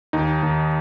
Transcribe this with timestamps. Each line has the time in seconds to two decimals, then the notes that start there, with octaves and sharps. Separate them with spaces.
0.13 D#2 D#4
0.43 D#2